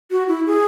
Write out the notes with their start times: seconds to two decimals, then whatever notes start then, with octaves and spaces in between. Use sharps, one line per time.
0.11 F#4
0.28 E4
0.46 G#4